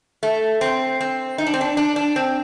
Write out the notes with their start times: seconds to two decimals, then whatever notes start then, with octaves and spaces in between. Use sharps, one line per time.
0.23 A3
0.61 C4
1.01 C4
1.38 D#4
1.47 D4
1.54 C4
1.61 D4
1.77 D4
1.96 D4
2.16 C4